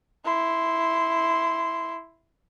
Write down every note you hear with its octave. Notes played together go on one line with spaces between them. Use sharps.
E4 C6